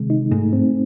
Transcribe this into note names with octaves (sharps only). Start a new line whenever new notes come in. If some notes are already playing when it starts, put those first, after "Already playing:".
Already playing: C3 D#3 G#3
D#4
G#2 A3
C4